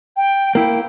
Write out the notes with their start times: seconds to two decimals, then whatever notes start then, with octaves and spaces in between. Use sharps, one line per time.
0.17 G5
0.55 A#3 E4 G5